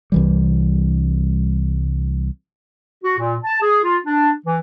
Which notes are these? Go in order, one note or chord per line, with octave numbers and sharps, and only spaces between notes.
C2 E3 G3
F#4
A#2
A5
G#4
F4
D4
E3